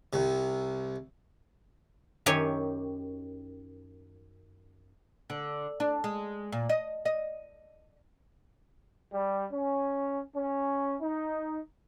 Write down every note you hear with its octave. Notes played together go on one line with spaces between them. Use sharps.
C2 C3
F#2 D#3 G4 C#5 G#5
D3
D4
G#3
A#2
D#5
D#5
G3
C#4
C#4
D#4